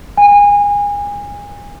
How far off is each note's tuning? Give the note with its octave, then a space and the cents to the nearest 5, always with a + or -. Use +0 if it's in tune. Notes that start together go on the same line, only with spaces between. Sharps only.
G#5 -25